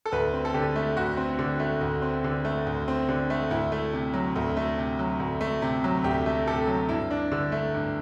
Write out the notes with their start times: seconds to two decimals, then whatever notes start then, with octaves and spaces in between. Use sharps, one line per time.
0.06 A4
0.12 D2 B4
0.33 C4
0.45 A4
0.54 D3 G4
0.76 A3
0.97 D2 F#4
1.17 C4
1.39 D3
1.60 A3
1.81 D2
2.02 C4
2.24 D3
2.45 A3
2.67 D2
2.88 C4
3.09 D3
3.30 A3
3.50 D2 E4
3.72 A3
3.93 C3
4.14 F#3
4.36 D2
4.57 A3
4.78 C3
4.99 F#3
5.20 D2
5.41 A3
5.62 C3
5.84 F#3
6.04 D2 G4
6.26 A3
6.47 C3 A4
6.67 F#3
6.89 G2 E4
7.11 D4
7.32 D3
7.52 A3
7.74 G2